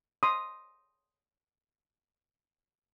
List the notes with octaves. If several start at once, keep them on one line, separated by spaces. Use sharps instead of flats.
C6 D#6